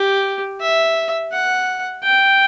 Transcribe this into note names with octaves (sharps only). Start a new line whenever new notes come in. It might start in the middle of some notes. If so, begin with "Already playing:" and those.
Already playing: G4
E5
F#5
G5